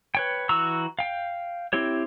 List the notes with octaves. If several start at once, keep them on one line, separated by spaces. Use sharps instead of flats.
B4 C#5 G5
E3 F#4 A#5 C#6 E6
F5 G5
C4 E4 G4 C#5